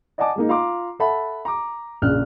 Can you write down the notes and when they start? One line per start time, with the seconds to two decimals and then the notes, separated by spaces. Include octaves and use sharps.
0.18 D5 D#5 F#5 G#5 A5 D6
0.36 G#3 A#3 D#4
0.48 F4 F5 A#5 C6 D6
0.99 A4 E5 F#5 A5 B5
1.45 A#5 D6
2.02 A#1 C#3 F6 F#6